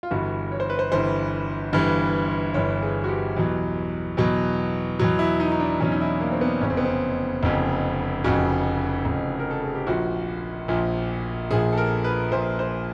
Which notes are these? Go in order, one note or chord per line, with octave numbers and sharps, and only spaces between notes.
F4
G1 G2 E3 F#4
C#5
C5
B4
C5
G1 G2 E3 C5
G1 G2 E3
G1 G2 E3 C#5
G#4
F#4
G4
E2 B2 F#3
E2 B2 F#3
E2 B2 F#3
E4
D#4
D#4
D4
E2 B2 F#3 C#4
D#4
E4
A#3
C4
B3
F1 F2 C#3 C#4
C4
B3
C4
F1 F2 C#3
F1 F2 C#3 F#4
F1 F2 C#3
A#4
A4
G#4
G4
A#1 A#2 F3 F#4
A#1 A#2 F3
A#1 A#2 F3 G#4
A4
A#4
B4
A#1 A#2 F3 C5
C5